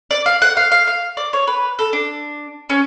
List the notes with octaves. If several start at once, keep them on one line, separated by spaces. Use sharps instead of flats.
D5
F5
F#5
F5
F5
F5
D5
C#5
B4
A4
D4
C#4